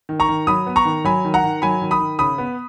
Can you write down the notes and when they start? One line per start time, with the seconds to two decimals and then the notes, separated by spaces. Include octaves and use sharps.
0.09 D#3
0.20 A#5 C#6
0.28 D#3
0.47 F#3 B5 D#6
0.66 B3
0.76 A#5 C#6
0.85 D#3
1.05 F#3 G#5 B5
1.25 D#3
1.34 F#5 A#5
1.44 D#3
1.62 F#3 G#5 B5
1.81 D#3
1.91 B5 D#6
2.00 D#3
2.19 C#3 B5 D#6
2.38 B3